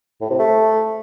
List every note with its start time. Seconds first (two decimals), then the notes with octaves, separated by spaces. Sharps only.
0.21 A2
0.30 C3
0.39 A3